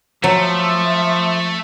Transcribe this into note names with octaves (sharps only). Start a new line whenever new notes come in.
F3 F#3 A3 E5